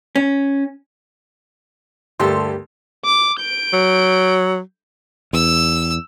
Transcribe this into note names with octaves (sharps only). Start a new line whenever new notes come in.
C#4
D2 G2 A#3 G4 A4 A5 C6
D6
G6 D7
F#3
E2 E6